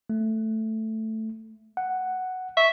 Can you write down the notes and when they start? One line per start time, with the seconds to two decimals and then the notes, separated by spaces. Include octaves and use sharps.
0.10 A3
1.77 F#5
2.57 E5 C#6